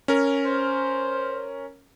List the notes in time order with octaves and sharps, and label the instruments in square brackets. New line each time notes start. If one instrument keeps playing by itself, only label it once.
[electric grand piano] C#4 A#4
[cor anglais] C5